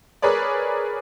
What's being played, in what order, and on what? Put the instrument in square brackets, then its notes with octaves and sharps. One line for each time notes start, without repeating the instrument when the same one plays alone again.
[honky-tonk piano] G#4 A#4 B4 C#5 D5